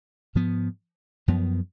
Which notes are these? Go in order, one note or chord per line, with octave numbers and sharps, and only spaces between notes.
G#2 F3 B3
F#2 F3 B3